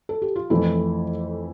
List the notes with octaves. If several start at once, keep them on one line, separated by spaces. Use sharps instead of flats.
A4
G4
F4
F2 E3 A3 E4